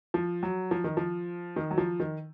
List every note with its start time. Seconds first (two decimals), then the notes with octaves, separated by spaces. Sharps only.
0.14 F3
0.43 F#3
0.71 F3
0.84 D#3
0.97 F3
1.56 D#3
1.71 F#3
1.78 F3
2.00 D#3